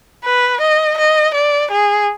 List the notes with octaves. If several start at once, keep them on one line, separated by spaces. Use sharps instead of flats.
B4
D#5
D#5
D5
G#4